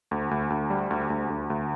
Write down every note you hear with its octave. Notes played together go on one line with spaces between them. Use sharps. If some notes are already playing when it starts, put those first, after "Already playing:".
D2
D2
D2
G3
D2
D2
D2
D2